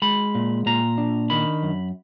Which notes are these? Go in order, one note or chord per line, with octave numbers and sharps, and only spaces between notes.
G#3 B5
A#2
A#2 A#5
D4
D#3 B5
F#2